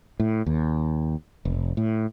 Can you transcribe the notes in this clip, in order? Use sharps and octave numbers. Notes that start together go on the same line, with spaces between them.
A2
D#2
F1
A2